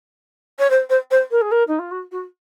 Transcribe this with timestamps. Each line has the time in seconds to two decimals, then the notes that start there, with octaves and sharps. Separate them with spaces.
0.59 C#5
0.70 C5
0.89 C5
1.11 C5
1.31 A#4
1.41 G#4
1.51 A#4
1.67 D#4
1.79 F4
1.91 F#4
2.11 F#4